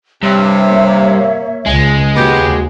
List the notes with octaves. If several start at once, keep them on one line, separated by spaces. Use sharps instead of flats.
G2 C3 C#5 E5
A#3
C#2 G#3
D#2 B3 F#4 G4